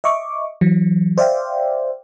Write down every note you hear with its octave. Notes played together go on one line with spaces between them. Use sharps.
D#5 E5 C#6 D6
E3 F#3
C5 D5 E5 F5 G5